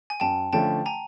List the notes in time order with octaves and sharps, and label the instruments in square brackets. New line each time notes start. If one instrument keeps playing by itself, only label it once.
[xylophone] G#5
[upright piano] F#2 [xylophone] G5 A5
[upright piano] D3 F3 A3 C#4 [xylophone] G5 A5
[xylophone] G#5 A#5